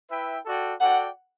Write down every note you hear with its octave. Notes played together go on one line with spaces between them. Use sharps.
E4 B4 E5 G5
F#4 A4 D5 G5
F#4 A4 D5 F#5 G5